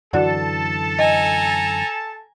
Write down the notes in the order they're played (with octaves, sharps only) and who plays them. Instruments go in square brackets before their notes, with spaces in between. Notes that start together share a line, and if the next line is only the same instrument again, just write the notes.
[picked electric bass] F#2 D3 E3 [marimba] F#4 D5 F#5 [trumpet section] A4 A5
[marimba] D#5 [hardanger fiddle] G#5 A#5